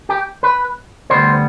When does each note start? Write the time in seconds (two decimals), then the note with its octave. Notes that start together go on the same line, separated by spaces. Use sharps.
0.09 G4
0.43 B4
1.10 D2 C3 G3 B3 C5